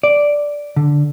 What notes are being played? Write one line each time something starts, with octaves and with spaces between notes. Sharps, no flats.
D5
D3